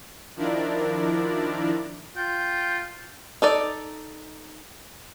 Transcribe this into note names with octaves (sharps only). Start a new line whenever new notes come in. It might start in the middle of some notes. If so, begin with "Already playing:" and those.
D#3 F3 D4 E4 A#4 D5
F4 G5
D#4 A4 D5